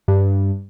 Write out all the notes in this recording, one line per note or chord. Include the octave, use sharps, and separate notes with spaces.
G2